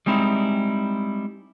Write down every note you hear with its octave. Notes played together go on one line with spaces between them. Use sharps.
G3 G#3 C4 D#4 E4